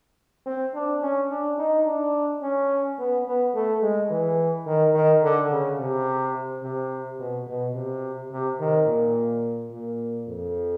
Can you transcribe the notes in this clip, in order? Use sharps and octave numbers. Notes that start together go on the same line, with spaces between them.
C4
D4
C#4
D4
D#4
D4
C#4
B3
B3
A3
G#3
E3
D#3
D#3
D3
C#3
C3
C3
B2
B2
C3
C3
D#3
A#2
A#2
F2